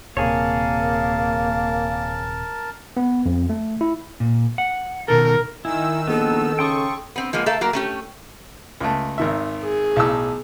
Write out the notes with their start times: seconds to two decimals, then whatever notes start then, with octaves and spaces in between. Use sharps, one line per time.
0.17 D#1 C3 A#3 G#4 A#4 C#5 A5
2.97 B3
3.26 F2
3.50 A3
3.81 E4
4.20 A#2
4.58 F#5
5.08 B2 D#3 A4 A#4
5.65 D#3 E4 G#5 E6
6.07 A#1 B3 A4
6.59 C#3 G5 C6 C#6 D#6
7.16 B3 C4
7.33 F3 G#3 A#3 B3
7.46 A3 A4 A#4 E5 F5
7.61 F#3 A#3 A#4
7.73 A3 C#4 G4
8.80 C#2 A3
9.18 G#1 D#3 E5
9.64 G#4
9.96 B1 A2 E6